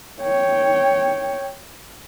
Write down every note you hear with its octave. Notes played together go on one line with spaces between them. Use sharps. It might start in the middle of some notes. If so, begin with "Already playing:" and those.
C#5 G5